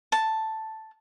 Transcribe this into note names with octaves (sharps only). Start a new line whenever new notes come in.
A5